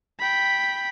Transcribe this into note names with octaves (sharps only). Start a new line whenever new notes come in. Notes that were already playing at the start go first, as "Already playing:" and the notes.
G5 B5